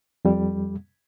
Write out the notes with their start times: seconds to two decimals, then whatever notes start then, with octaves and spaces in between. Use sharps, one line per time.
0.25 F2 G3